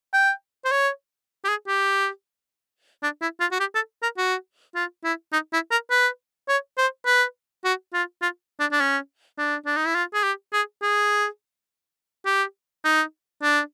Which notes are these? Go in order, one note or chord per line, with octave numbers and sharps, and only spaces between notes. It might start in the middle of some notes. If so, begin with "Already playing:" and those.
G5
C5
C#5
G4
G#4
G4
D4
E4
F4
F#4
G4
A4
A#4
F#4
F4
E4
D#4
E4
A#4
B4
C#5
C5
B4
F#4
F4
F4
D4
D4
C#4
D4
D4
D#4
E4
F4
G#4
G4
G#4
G#4
G4
D#4
D4